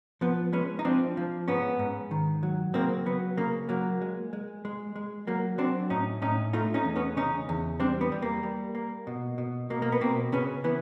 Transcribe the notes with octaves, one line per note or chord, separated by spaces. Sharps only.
F3 B3
G#3 B3 C#4
D#4
F3 C4 D4
F3
G#2 B3 C#4
G#2
D#3
F#3
C#3 A#3 C4
F#3 B3
C#3 A#3
F#3 A#3
G#3
G#3
G#3
G#3
F#3 A#3
F#3 C4 D4
A2 C#4 D#4
A2 C#4 D#4
A3 D#4 F4
C#4 D#4
E2
B3 C#4
C#3 C#4 D#4
E2
G3 C4 D4
B3
G3
A#3
G3
A#3
B2
B2
B2 A#3
A#3
B3
B2 A#3 C4
C#3 B3 C#4
E3 B3